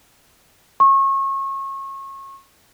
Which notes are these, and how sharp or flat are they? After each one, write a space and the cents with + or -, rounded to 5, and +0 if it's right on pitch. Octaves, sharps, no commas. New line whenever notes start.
C#6 -30